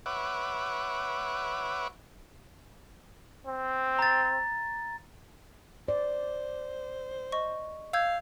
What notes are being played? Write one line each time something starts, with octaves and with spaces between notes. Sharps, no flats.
B4 C#5 E5 F#5 D6
C4
A#5 A6
C5 D5
D#5 C#6
F5 E6 G6 G#6